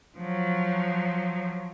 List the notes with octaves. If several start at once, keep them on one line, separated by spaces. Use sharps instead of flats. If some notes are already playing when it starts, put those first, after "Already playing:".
F3 F#3